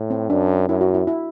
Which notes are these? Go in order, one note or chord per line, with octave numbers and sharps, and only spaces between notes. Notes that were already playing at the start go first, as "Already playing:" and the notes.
Already playing: A2
C4
F#2 D4
F#2 E4
F#4
E4
E4